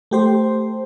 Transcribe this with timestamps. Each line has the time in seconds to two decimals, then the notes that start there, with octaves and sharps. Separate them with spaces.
0.11 A3 G4 C5